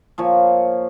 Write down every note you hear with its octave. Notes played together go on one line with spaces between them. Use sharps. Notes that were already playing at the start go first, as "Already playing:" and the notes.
A#2 F3 C#5